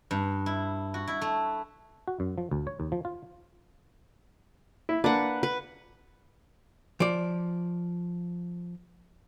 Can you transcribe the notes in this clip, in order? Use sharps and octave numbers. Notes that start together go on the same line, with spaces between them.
G2
E4
F#4
E4
A3
F#4
F#2
F3
D2
C#5
D#2
F3
F4
E4
A#3 D4 B4 F#5
B4
F3 D5